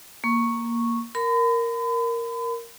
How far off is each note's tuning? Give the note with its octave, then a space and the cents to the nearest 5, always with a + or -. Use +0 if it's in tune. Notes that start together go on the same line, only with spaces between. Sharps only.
A#3 +0 C#6 -5
A#4 +0 B5 +40